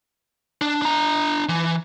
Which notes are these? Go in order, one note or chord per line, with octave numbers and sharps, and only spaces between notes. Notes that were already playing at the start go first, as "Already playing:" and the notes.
D4
D4 A#5
E3